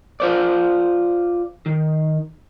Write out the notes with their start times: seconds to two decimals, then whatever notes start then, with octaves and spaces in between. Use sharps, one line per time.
0.20 F4 C5 D5
1.66 D#3